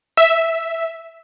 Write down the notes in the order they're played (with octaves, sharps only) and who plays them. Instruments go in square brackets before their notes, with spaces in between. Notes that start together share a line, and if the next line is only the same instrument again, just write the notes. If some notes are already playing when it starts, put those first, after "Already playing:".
[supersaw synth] E5